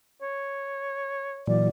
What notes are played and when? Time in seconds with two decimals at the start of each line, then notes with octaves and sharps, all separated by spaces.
0.22 C#5
1.47 A#2 E3 F#3 D5